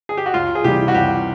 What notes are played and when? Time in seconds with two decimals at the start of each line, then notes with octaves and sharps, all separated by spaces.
0.09 G#4
0.17 G4
0.26 F#4
0.34 C#2 F4
0.55 G#4
0.64 C3 E3 G3 G4
0.88 F#4
0.95 C#2 G4